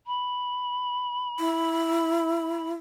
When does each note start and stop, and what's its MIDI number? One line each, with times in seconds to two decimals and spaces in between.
0.06 2.70 83
1.39 2.74 64